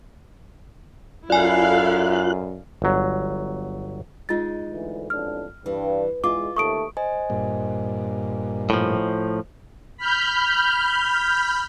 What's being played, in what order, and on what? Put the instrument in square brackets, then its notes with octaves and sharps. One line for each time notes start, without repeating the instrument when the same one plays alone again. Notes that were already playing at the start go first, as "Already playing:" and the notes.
[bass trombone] F#2 [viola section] E4 A4 F5 [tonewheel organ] F4 F#6 [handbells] D5 G#5
[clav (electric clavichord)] G1 F#3
[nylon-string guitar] G#3 D#4 [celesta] F4 A6
[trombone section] D2 E3
[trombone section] A1 F2 D4 [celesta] F6
[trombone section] G2 [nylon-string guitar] E3
[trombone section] E2 E3 G#3 [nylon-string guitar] F4 [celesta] D6
[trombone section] D#2 A3 [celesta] C#6 D#6 D7
[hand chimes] C5 D#5 G#5
[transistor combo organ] G2 A#2
[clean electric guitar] A2 F3
[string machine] B5 F6 G6